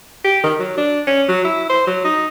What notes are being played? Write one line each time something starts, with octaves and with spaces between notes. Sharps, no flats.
G4
D#3
F#3
D4
C#4
F#3
E4
C5
F#3
D#4